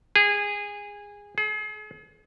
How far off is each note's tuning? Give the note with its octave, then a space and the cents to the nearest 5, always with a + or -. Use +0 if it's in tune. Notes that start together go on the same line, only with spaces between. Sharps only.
G#4 -20
G#4 +40